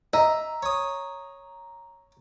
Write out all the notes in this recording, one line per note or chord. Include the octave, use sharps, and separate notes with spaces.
D#5 E5 A#5
C#5 D#6